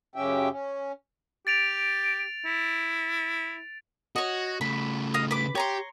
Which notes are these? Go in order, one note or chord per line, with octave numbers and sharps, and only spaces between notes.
F#2 C#3 C#4 G4 E5 G5
C#4
G4 A6 D7 F7
E4
F#4 C#5 D#5
C#3 A3 B5
D#5 F5 D#6
B4 B5 D6
G4 C#5 A#5 C6